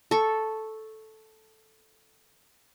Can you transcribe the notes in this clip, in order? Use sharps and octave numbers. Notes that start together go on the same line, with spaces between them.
A4 C#6